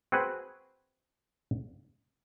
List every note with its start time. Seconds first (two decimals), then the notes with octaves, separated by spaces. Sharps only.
0.12 C4 F#4 G#4 B4